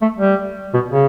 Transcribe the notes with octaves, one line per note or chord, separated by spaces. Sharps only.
A3
G3
B2
C#3